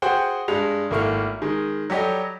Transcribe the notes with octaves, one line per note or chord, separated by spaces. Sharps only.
F#4 G#4 C5 F#5 G5
G2 G#3 F7
G#1 A3 A#3 E4 C#6 F6
D#3 G#3
F#3 G3 G4 A4 D#5